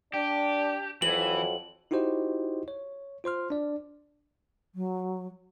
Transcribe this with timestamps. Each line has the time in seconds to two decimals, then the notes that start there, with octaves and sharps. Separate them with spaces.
0.14 D4 G4
1.02 F2 E3 F#3 F#7
1.91 D#4 E4 F#4 G4 C5 D#5
2.68 C#5
3.24 F4 C5 C6 F6
3.50 D4 D5
4.75 F#3